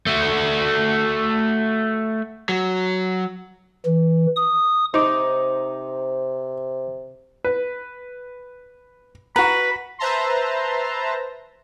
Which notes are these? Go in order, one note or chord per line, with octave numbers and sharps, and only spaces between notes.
A3 F#4
F#3
E3
D#6
C3 D#4 C5 D6
B4
F#4 B4 A#5 B5
B4 C5 E5 A5 A#5 C6